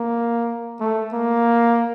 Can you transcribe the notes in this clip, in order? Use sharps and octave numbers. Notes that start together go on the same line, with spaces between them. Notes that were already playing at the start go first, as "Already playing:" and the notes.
Already playing: A#3
A3
A#3